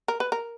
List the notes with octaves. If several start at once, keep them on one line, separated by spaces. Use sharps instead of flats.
A#4
B4
A#4